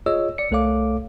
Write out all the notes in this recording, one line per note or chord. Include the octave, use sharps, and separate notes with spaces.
F4 G#4 C#5 D#5 E6
D5 C#7
C2 A3 A4 C#5 F5 D6